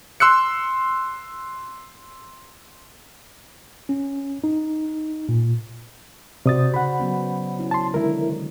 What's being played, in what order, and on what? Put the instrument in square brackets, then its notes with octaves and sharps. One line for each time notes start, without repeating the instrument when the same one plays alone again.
[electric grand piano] C6 E6 F#6 C#7
[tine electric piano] C#4
D#4
A#2
[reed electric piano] C3 D#6 A6 [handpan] F#4 C5 D5
[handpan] C#3 [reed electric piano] F#5 B5
[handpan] F#3 B3 C#4
C#4 E4
[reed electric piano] A5 C6
[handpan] D3 D#3 G#3 [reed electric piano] E4 A#4